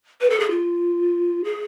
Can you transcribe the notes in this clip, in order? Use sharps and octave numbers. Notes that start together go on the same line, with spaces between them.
B4
A4
G#4
F4
G#4